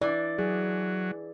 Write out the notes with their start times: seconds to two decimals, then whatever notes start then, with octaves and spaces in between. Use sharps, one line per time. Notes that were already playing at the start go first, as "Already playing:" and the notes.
0.02 E3 D5
0.38 F#3 G#4